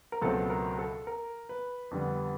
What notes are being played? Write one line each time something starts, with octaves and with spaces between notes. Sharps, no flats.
A#4
C#2 B2 F#3 A3 C4 A4
A#4
A4
A#4
B4
F2 D3 G3 B3